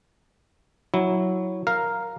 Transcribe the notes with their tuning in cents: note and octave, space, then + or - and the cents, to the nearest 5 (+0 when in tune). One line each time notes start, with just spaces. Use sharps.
F#3 +0 E4 -10
A#4 +0 F5 +0